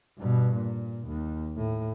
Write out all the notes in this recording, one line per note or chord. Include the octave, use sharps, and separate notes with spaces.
G2 B2
A#2
D#2
A2